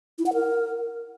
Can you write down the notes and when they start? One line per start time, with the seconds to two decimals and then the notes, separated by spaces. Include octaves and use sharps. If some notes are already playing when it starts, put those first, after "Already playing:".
0.19 E4
0.26 F#5
0.33 A#4